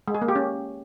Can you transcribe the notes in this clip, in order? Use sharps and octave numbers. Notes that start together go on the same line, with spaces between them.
G#3
G#4
A#3
G4
C#4